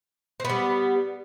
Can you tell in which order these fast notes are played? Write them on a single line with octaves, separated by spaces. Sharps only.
C4 B3 G3